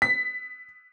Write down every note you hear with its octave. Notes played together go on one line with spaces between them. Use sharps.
B6